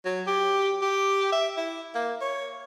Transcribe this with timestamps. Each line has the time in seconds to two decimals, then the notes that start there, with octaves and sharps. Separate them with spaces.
0.05 F#3
0.27 G4
0.82 G4
1.32 E5
1.57 E4
1.95 A#3
2.21 C#5